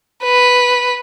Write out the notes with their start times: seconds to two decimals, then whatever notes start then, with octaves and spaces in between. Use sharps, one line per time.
0.24 B4